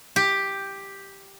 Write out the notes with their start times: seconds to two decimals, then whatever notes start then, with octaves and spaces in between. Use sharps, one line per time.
0.16 G4